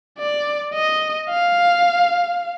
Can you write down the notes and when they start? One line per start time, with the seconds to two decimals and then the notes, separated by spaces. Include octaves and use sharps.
0.19 D5
0.74 D#5
1.30 F5